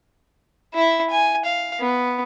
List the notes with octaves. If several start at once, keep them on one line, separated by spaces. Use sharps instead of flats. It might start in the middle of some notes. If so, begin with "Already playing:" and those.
E4 E5
G#5
F5
B3